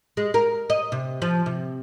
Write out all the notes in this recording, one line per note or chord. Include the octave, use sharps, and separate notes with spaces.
G#3
A#4
D#5
C3
F3
C3